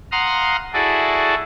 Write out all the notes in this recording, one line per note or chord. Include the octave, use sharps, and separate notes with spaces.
F5 F#5 A#5 C6 D#6 F6
E4 F#4 G#4 A4 D5